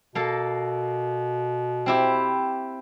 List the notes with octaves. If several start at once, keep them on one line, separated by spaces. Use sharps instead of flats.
B2 A#3 A4
C4 E4 G4